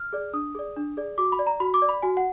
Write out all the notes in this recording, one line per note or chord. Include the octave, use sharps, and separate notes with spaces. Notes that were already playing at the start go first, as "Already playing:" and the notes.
Already playing: F6
G#4 D5
D4 D#6
G#4 D5
D4
G#4 D5
F#4 D6
B5
D5
A#5
F#4 B5
D6
D5
B5
F#4 G#5
F#5